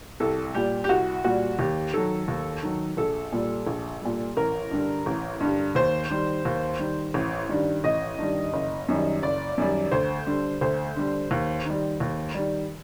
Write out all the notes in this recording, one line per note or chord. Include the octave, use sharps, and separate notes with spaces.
C2 A4
A#2 G3 G4
G4
C2 F#4
A#2 G3 F#4
D#2 G4
D#3 F#3 A4
D#2
D#3 F#3
A#1 A4
A#2 G3
A#1
A#2 G3
A1 A#4
G2 D3 G3
A1
G2 D3 G3
D#2 C5
D#3 G3
D#2
D#3 G3
A1
G2 D#3 G3
A1 D#5
G2 D#3 G3
F#1
F#2 D#3 G3
F#1 D5
F#2 D#3 G3
D2 C5
D3 G3
D2 C5
D3 G3
D#2
D#3 G3
D#2
D#3 G3